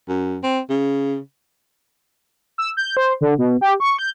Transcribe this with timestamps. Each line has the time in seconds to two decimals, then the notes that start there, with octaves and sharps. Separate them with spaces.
0.08 F#2
0.43 C4
0.69 C#3
2.58 E6
2.77 G6
2.97 C5
3.21 D3
3.38 B2
3.61 G4
3.80 C#6
3.99 G6